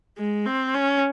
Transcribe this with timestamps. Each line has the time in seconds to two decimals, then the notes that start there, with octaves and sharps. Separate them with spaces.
0.18 G#3
0.46 C4
0.74 C#4